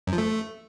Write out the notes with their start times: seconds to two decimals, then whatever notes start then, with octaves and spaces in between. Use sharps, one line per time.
0.07 F#2
0.13 F3
0.18 A3